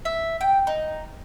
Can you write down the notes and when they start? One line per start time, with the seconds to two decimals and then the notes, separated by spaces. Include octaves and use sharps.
0.05 E5
0.41 G5
0.67 D#4